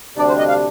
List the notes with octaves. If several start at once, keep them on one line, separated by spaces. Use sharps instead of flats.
D2 C3 G3 D4 D5
C5
D#5
F5